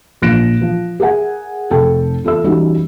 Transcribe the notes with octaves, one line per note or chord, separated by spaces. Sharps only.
A#1 F3 F#6 A#6 D7 E7
F3
G#4 A#4 E5 F#5 G#5
F1 A4 G5
E2 F4 A4 E5 E6
E3 G3 C#4 D#4 E4 F#4